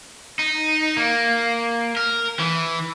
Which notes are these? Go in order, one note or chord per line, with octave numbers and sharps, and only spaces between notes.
D#4
A#3
A#4
E3